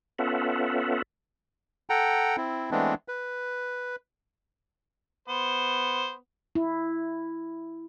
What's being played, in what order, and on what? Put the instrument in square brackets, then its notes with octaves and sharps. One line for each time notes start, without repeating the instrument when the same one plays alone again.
[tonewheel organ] B3 C#4 F4 A4 E5 F#5
[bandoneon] A4 F#5 G5 A#5
C4 E4
E3 G#3 A3 B3 C4 D4
B4
[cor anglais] B3 [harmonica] C5
[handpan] E4